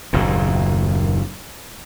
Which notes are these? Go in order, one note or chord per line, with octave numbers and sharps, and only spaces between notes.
F#1 D#2 A#2